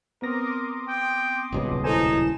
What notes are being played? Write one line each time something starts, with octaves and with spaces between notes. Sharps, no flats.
B3 C4 A#4 C6 D6 D#6 A#6
G5
D#1 C#2 B2
D#4 E4 A4 C5 G#5 E7